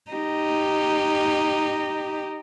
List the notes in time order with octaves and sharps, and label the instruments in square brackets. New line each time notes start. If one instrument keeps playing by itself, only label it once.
[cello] D#4 G4